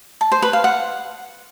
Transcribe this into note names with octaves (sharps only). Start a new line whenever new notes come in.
A5
C5
B4
F5
F#5